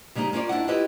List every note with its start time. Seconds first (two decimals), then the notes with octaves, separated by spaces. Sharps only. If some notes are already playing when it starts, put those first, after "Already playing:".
0.15 C#3 G3 A#3 C4 D#4
0.33 A#3 C#4 F4 D5
0.49 D#2 D4 E4 F#5
0.68 E4 F4 G4 B4 D#5